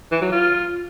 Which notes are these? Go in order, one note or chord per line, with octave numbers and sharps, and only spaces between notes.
E3
F#3
F4